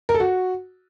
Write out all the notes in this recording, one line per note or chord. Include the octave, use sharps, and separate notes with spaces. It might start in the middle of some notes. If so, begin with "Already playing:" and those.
A#4
A4
F#4